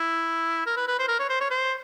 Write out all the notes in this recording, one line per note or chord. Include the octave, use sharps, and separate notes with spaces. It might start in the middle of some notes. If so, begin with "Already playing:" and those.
Already playing: E4
A#4
B4
B4
C5
A#4
C#5
C5
C#5
C5